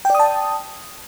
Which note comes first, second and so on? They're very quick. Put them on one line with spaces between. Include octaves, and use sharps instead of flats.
G5 D5 D#6 A5